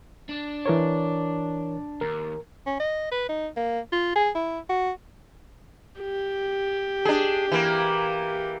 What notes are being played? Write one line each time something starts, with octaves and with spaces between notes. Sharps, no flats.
D4
E3 A#4 C#5
D#2 A#4
C#4
D#5
B4
D#4
A#3
F4
G#4
E4
F#4
G4
D4 G#4
E3 A#3